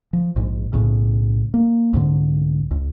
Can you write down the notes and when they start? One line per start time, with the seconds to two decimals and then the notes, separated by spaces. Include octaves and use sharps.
0.13 F3
0.36 A#1 G#2
0.73 B1 A2 C#3
1.54 A#3
1.93 C2 G#2 D3
2.71 C#2